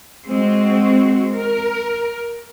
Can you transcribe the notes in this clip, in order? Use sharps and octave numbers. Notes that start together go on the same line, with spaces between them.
G#3 C4 F#4
A#4